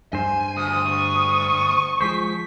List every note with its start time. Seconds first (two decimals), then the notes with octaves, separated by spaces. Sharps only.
0.13 G2 C5 G#5
0.56 D2 D#6
0.91 C#6
2.01 F3 G#3 C5 B6